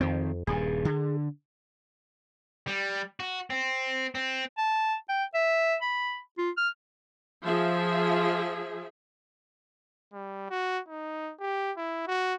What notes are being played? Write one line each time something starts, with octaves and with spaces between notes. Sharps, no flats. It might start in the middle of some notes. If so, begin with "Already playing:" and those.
F2 D#3 C4
D#1 G2 G#4
D3
G3
F#4
C4
C4
A5
G5
E5
B5
F4
F6
F3 G#4 E5
G3
F#4
D#4
G4
E4
F#4